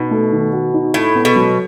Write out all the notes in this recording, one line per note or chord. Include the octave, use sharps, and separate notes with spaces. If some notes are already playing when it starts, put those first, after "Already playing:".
Already playing: B2 D#4
A3
D#3
F#4
D#4
A2 E4
B3
B2
F#3